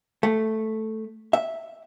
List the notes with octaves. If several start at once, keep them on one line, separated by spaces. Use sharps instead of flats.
A3
E5